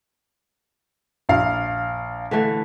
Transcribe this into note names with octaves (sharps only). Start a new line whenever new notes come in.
A#1 F5
D3 E3 A3